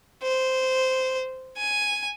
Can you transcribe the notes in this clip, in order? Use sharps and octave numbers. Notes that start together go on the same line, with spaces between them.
C5
G#5